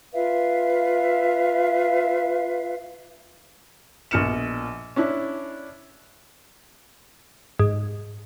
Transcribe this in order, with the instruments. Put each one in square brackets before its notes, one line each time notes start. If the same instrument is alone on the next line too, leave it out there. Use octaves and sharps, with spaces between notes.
[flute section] F4 B4 E5 F5
[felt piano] A#1 B2 F6 C#7 E7
C#4 D4 E4
[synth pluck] G#2